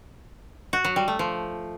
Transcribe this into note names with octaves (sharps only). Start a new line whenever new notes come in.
F#4
F#3
G3
A3
F3